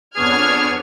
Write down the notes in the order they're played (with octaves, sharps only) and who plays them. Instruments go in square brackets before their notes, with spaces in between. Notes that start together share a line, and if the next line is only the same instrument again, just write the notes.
[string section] F2 F6 G#6 [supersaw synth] B3 D4 C#5 [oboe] G#4